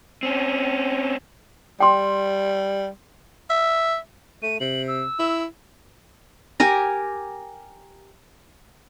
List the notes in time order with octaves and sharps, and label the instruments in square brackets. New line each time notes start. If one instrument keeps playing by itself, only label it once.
[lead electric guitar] C4 C#4
[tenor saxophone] G3 [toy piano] G5 C6
[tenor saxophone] E5
[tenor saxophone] A3 [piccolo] D#7
[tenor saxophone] C3 [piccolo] F#7
[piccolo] E6
[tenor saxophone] E4
[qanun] G4 A#4 G#5 A#5